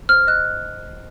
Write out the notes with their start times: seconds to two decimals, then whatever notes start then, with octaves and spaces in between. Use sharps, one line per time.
0.09 C5 F6
0.27 D#5 F#6